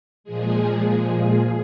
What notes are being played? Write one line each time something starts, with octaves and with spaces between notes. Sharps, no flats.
A#2 F3 G#3 G#4